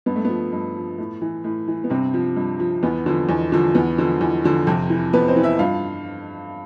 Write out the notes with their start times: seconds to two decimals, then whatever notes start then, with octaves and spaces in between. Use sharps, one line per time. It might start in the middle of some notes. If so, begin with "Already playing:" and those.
0.06 G2 B3
0.16 A3
0.25 F3 B3
0.52 G2
0.76 F3
0.98 A2
1.21 E3
1.44 A2
1.68 E3
1.84 B3
1.90 G2 C3 C4
2.14 F3
2.36 G2
2.60 F3
2.83 E2 B3
3.06 D3 F3
3.29 E2
3.52 D3 F3
3.75 E2 B3
3.98 D3 F3
4.21 E2
4.44 D3 F3
4.67 F2 C3 C4
4.90 E3
5.13 F2 B3 B4
5.28 C4 C5
5.36 E3
5.43 E4 E5
5.59 G2 F4 F5